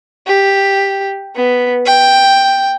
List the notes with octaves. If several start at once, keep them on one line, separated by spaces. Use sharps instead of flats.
G4
B3
G5